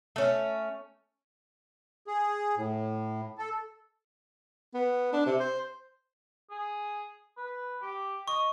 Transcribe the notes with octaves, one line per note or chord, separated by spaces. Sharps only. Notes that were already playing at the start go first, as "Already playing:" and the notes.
A3 C#4
G#4
A2
A4
B3
D4
C3
C5
G#4
B4
G4
D#5 C#6